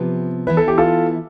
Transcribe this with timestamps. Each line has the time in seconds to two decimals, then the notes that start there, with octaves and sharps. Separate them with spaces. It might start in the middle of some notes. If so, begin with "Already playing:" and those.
Already playing: C3 F3 B3 G4 B4
0.47 E3 B3 E4 B4
0.57 A4
0.68 G4
0.78 F4 A4